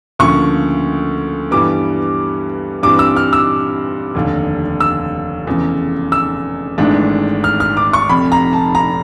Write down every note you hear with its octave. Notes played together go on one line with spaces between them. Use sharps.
D2 C#3 F3 A#3 C#6
G2 E3 G3 B3 D6
G2 E3 G3 C4 D6
E6
F6
E6
F1 D#2 D3
E6
F1 E2 C#3
E6
G#1 G#2 E3 A3 D4
F6
F6
D6
C#6
F1 F2 C3 B5
A#5
A5
A#5